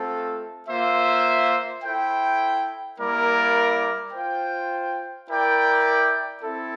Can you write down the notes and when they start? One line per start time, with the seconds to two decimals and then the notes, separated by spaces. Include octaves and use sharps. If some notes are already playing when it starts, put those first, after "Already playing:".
Already playing: A3 C4 F4 A4
0.68 A#3 F4 C5 E5
1.84 E4 A4 C5 G5
2.99 G3 A#3 E4 A#4 D5
4.13 F4 C5 G5
5.28 E4 A#4 D5 G5
6.43 C4 E4 A4